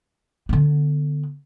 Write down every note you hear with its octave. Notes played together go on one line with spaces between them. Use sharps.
D3 B3